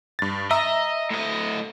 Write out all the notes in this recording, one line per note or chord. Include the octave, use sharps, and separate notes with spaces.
G2 A6
D#5 E5 A#5 E6
A2 D#5